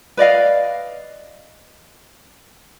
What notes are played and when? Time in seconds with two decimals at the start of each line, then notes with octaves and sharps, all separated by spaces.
0.17 B4 D5 D#5 F5